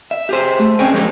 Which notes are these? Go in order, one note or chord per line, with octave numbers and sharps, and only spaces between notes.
E5
G4 G#4 C5
A3
C4 C#4 G#4 C5 G5 G#5
F2 G#3 A#3 D#4 G4